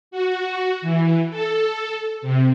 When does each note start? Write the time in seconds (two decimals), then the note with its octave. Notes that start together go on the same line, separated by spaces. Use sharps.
0.11 F#4
0.82 E3
1.30 A4
2.22 C3